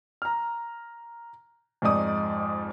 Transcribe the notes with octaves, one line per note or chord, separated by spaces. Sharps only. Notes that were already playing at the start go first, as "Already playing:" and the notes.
A#5 F6
F2 G#2 D#4 D5 D#6